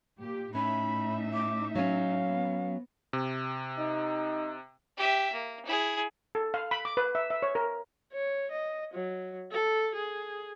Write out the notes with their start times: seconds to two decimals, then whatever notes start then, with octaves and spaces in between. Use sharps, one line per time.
0.18 A#2 G4
0.55 A2 C#4 D#4 E5 B5
1.34 D6
1.75 F#3 C#4 F5
2.25 B3
3.13 C3
3.79 D#4
4.97 G4 E5
5.33 A#3
5.66 E4 G#4
6.35 A4
6.54 F5
6.71 B5
6.85 D6
6.97 B4
7.15 E5
7.30 E5
7.43 C#5
7.55 A#4
8.13 C#5
8.52 D#5
8.94 F#3
9.52 A4
9.95 G#4